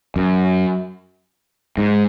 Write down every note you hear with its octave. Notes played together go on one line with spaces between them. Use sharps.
F#2
G#2